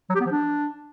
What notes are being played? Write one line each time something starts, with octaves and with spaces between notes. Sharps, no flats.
F#3
G4
B3
F3
D4